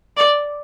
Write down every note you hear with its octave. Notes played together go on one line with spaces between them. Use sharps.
D5